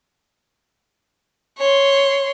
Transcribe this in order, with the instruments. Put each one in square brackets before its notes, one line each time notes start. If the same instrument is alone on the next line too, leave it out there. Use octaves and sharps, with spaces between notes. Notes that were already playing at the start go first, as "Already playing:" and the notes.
[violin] C#5 C6